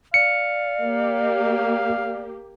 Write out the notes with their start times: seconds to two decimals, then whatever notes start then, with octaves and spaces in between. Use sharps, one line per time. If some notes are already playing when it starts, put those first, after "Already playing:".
0.14 D5 F5 C#7
0.83 A#3 G4